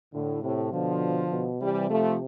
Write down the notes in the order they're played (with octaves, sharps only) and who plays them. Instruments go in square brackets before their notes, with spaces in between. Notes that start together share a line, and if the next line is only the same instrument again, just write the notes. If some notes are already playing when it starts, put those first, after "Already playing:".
[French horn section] A2 [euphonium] D3
[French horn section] A2 [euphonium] C3
[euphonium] B2 [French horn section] D3 F3
[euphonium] B2
[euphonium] C3 [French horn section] E3 G3
[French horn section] F3 A3